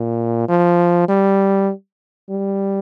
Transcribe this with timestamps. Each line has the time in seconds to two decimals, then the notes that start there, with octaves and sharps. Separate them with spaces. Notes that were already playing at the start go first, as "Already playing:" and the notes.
Already playing: A#2
0.48 F3
1.08 G3
2.30 G3